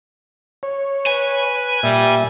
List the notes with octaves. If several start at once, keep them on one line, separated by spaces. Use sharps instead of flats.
C#5
B4 G#5
A#2 G3 E5